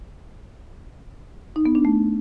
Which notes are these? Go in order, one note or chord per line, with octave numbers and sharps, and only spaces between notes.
D#4
B3
D4
A3